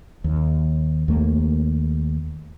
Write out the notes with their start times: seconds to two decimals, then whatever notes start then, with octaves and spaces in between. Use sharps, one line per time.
0.24 D#2
1.08 D#2 A3 A#3